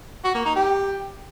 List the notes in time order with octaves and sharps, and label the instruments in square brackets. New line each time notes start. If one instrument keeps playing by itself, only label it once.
[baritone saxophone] F#4
A#3
D#4
G4